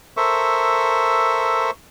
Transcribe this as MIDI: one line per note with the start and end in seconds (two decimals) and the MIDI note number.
0.17 1.71 69
0.17 1.71 70
0.17 1.71 72
0.17 1.71 76
0.17 1.71 85